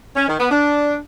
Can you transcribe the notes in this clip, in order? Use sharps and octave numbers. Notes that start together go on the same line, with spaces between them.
C#4
D#3
B3
D4